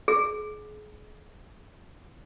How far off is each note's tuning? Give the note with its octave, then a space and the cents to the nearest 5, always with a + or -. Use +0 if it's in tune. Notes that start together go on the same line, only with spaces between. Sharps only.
G#4 +30